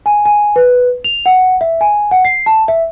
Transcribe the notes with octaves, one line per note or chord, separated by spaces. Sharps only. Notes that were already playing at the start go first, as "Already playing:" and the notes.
G#5
G#5
B4
F7
F#5
E5
G#5
F#5
C7
A5
E5